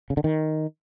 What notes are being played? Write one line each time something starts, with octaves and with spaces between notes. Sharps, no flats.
C#3
D3
D#3